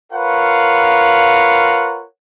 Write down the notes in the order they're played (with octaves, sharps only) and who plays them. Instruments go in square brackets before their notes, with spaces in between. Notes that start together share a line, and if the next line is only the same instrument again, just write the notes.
[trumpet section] F4 A#4 B4 C#5 F5 F#5